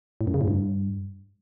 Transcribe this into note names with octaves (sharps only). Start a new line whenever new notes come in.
A2
F#2
C#3
A2
G2